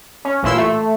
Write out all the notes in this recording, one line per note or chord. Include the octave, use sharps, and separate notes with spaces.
C#4
A1 A#2 E4 C6 E6
A3